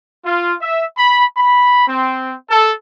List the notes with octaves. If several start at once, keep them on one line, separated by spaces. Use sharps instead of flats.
F4
E5
B5
B5
C4
A4